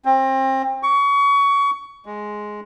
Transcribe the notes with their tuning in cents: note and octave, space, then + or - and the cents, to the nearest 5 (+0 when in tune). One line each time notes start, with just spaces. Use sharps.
C4 +30
C#6 +25
G#3 +5